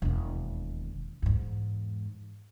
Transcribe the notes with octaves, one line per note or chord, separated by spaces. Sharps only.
E1 D#2
E2 G#2